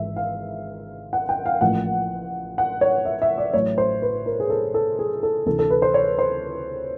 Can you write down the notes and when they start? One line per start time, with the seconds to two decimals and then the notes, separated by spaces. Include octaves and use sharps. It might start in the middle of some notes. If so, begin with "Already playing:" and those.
Already playing: G#1 G#2 E3 G#3 E5
0.16 F5
1.13 F#5
1.29 G5
1.46 F5
1.61 A1 A2 F3 A#3 F#5
2.58 F#5
2.81 C#5
3.05 E5
3.22 E5
3.38 D5
3.53 A1 A2 F#3 A3 C#5
3.78 C5
4.02 B4
4.26 A#4
4.40 G#4
4.50 A4
4.74 A4
4.99 G#4
5.23 A4
5.46 D2 C3 E3 A4
5.59 A4
5.70 B4
5.82 C5
5.94 C#5
6.19 C5